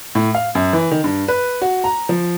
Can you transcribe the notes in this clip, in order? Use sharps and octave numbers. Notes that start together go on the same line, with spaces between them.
A2
F5
F#2
E3
D#3
G2
B4
F#4
A#5
F3